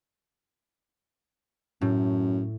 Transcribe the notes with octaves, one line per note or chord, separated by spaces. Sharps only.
F#2 A2